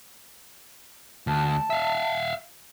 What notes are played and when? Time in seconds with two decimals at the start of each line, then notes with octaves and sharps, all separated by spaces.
1.27 D2 A5
1.70 E5 F5